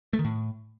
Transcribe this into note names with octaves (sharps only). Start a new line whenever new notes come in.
A3
D#3
A2